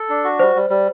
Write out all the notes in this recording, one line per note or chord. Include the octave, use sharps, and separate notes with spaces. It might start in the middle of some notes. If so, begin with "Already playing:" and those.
Already playing: A4
D4
F#4
G3 C5
G3
G3